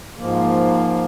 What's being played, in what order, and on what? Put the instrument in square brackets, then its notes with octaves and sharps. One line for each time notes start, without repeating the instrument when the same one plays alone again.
[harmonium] G#2 F3 A#3